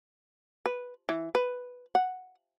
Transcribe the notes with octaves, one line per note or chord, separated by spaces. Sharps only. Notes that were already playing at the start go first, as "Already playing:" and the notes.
B4
E3
B4
F#5